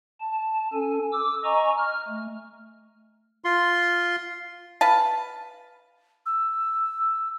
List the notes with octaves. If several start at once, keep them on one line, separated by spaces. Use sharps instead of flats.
A5
C#4 A4 G#5
D6 E6
D#5 G#5 A#5 C#6
F6
A3
F4 C6
B4 F5 A5
E6